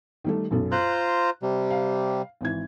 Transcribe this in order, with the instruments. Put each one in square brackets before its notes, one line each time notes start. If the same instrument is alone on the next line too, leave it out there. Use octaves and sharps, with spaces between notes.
[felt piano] D#3 G3 A3
B1 F#2 A4
[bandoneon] F4 C5 A#5 [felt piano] F#6
[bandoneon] C3 G3
[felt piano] F5
G#1 E3 G#6